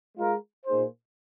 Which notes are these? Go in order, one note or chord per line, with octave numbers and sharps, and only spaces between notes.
G#3 F4 A#4
A#2 A#3 D#4 G#4 C5